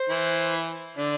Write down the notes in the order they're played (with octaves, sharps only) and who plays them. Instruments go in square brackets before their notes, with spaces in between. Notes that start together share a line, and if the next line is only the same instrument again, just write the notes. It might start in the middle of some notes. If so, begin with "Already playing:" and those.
Already playing: [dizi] C5
[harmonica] E3 E4
D3 D4